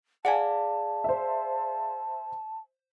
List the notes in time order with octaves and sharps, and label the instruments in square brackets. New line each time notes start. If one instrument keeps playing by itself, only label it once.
[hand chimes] G#4 D5 F5 [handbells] F#5 G#5 [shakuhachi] A5
[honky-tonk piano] C5 E5